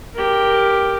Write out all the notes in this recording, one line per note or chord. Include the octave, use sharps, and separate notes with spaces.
G4 A#4